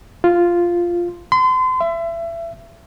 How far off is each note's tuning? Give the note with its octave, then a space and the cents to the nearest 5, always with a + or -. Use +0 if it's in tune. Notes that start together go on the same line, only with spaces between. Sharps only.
F4 -5
C6 -35
E5 +30